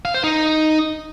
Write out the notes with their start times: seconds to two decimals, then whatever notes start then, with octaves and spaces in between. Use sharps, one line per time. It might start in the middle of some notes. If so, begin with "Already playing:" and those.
0.05 F5
0.14 C5
0.24 D#4